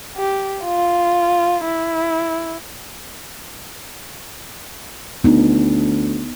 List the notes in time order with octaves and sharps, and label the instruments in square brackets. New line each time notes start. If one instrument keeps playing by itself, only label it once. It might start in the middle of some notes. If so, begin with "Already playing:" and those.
[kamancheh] G4
F4
E4
[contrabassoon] D2 [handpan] B3 D#4